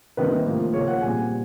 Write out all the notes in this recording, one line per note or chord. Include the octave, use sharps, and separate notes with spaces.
C3 D#3 G3 A#3 B4
A2 F3 A#3
C#3 F3 A#3 C#5
F#5
A#2 G3 C4 G#5